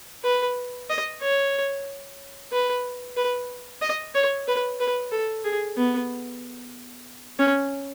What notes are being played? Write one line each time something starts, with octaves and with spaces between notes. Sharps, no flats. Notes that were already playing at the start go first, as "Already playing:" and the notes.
B4
D#5
C#5
B4
B4
D#5
C#5
B4
B4
A4
G#4
B3
C#4